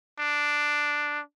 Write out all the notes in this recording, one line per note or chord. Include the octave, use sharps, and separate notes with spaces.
D4